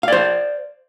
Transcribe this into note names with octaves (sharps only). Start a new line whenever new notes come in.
C5 D5 F5